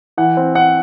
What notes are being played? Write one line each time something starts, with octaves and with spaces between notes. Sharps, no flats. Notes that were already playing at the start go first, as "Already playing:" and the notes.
E3 F#5
C4
C4 F#5